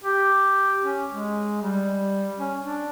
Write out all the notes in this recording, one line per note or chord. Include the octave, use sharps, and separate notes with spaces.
G4
C#4
G#3
G3
C#4
D4